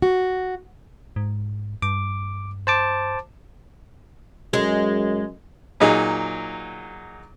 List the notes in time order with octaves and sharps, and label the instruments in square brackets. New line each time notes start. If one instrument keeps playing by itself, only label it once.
[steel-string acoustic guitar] F#4
[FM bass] G#2
[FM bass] G2 [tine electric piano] D6
[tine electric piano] C5 A5 D6
[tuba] F#2 [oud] G#3
[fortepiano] A#2 F#3 D#4 G#4